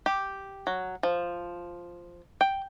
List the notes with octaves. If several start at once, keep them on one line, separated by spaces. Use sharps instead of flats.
G4
F#3
F3
G5